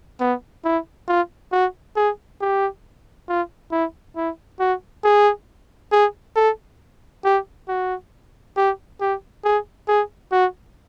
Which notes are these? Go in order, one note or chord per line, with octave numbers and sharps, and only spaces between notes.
B3
E4
F4
F#4
G#4
G4
F4
E4
E4
F#4
G#4
G#4
A4
G4
F#4
G4
G4
G#4
G#4
F#4